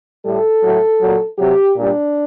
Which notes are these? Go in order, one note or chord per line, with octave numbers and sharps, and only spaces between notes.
A2 G3 A4
A2 F#3
A#2 F#3
C3 F#3 G4
A#2 G3 D4